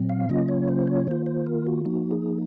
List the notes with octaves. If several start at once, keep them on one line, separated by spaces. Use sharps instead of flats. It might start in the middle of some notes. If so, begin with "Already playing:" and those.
Already playing: A#2 F#3 C4
F5
C#3 F#3 A#3 C#4 F4 D#5
C#5
C5
C#5
D#3 A#3 F4 C5
C5
A#4
F#4
F3 A#3 D#4 F#4
G#4